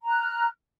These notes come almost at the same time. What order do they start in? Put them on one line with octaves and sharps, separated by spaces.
A#5 F#6 F6